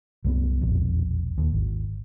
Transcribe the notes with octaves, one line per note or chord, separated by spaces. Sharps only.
C2 F#2 F3 B3
E1 A#1 F2
D#2
G#1